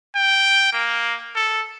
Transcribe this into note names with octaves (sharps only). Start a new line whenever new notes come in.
G5
A#3
A4